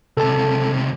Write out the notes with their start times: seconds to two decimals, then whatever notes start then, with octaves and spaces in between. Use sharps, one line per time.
0.17 C#2 C3 A4 A5